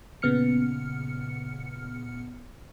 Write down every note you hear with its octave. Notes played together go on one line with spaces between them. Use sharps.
A#2 C#3 B3 F6 C#7